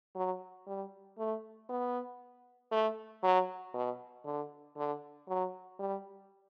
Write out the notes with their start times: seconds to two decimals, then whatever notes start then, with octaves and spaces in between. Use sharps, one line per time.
0.16 F#3
0.67 G3
1.18 A3
1.69 B3
2.72 A3
3.23 F#3
3.74 B2
4.25 D3
4.77 D3
5.28 F#3
5.79 G3